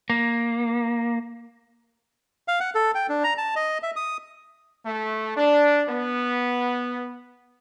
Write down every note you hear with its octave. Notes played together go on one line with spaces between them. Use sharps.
A#3
F5
F#5
A4
G5
D4
A#5
A5
D#5
E5
D#6
A3
D4
B3